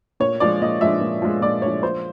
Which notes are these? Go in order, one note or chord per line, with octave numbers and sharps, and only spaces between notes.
A#2 C#5
F3 G#3 D5
A#2 D#5
F3 G#3 E5
A#2
F3 G#3
A#2 D5
F3 G#3 C#5
F3 C5